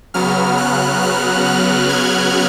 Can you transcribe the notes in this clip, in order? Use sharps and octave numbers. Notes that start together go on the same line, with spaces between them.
C#3 F#3 B3 F6
F#6
F6
F#6
G#6